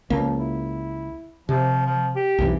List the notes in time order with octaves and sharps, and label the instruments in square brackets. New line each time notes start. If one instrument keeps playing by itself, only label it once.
[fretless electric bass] C#2 A#3 [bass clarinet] F3
[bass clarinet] E4
[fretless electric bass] C3 [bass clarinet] F3
[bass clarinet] F3
G4
[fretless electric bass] B1 F2 E3